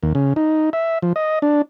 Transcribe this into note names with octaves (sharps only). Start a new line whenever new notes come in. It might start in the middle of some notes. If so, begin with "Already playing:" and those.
D#2
C#3
D#4
E5
F3
D#5
D4